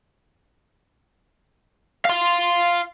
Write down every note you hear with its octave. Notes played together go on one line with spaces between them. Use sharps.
F5 C6